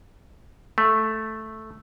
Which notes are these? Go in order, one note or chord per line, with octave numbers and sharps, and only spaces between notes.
A3